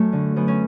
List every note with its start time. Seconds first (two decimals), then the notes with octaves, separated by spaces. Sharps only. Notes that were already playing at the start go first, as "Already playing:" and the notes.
Already playing: F#2 A3
0.13 D3
0.36 F#2 B3
0.48 C#4